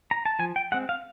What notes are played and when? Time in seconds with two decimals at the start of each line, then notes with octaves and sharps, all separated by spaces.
0.11 A#5
0.26 A5
0.39 F3 G#5
0.56 G5
0.72 G#3 C4 F#5
0.89 F5